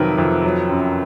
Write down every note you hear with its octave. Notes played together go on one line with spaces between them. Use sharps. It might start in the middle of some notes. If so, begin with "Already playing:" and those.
Already playing: F2 C3 D#3 F#3 A#4 B4
F2
F#3
F#2